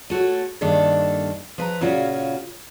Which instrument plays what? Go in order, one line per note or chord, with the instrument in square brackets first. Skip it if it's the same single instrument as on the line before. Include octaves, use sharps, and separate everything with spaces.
[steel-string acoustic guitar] A3 F#4 A4 C#5
G2 D#3 A#3 D4 A4
F3 B4 A#5
A#2 C#3 C#4 F4 F#4